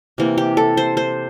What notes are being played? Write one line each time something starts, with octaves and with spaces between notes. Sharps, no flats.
C3 E3 A#3
G4
A4
C5
C5